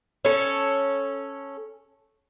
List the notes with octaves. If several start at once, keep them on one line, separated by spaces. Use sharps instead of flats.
C#4 A4